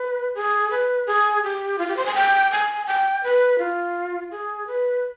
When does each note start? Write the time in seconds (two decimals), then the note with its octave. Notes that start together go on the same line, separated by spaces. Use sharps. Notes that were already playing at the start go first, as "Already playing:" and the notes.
Already playing: B4
0.35 G#4
0.71 B4
1.07 G#4
1.44 G4
1.79 F4
1.88 G4
1.97 C5
2.06 G#5
2.15 G5
2.52 G#5
2.87 G5
3.24 B4
3.59 F4
4.32 G#4
4.67 B4